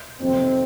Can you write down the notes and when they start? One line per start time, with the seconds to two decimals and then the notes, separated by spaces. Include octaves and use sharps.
0.20 F2 C3 D#3 F#3 C4